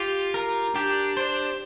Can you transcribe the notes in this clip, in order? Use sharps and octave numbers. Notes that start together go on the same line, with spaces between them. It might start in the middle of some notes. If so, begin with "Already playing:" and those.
Already playing: F4 G4
A#4
D4 G4
C5